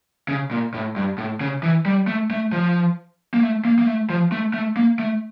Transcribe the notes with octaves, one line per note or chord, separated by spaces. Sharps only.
C#3
A#2
A2
G2
A2
C#3
E3
G3
A3
A3
F3
A#3
A3
A#3
A#3
A3
F3
A3
A3
A#3
A3